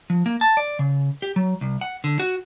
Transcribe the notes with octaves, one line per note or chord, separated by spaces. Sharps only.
F3
A#3
A5
D5
C#3
G4
F#3
C2
F#5
D3
F#4